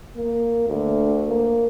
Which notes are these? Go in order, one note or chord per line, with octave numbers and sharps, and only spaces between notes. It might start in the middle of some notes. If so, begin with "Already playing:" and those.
A#3
D2
A#3